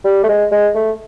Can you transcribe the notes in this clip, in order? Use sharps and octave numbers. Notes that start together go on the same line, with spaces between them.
G3
A3
G#3
G#3
A3